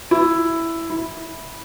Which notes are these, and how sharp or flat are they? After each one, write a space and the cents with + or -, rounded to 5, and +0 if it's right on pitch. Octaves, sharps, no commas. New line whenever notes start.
E4 +5
E4 -10